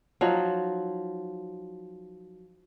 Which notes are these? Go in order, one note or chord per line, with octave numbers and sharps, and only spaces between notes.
F3 F#3 D#4